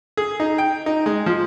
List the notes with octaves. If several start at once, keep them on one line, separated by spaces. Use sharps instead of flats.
G#4
D#4
G5
D#4
G#3
F3